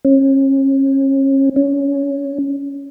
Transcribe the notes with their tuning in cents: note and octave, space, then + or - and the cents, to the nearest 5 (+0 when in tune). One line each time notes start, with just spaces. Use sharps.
C#4 -35
C#4 +15